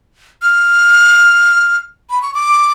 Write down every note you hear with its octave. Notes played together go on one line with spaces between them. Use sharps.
F6
B5
C#6
D6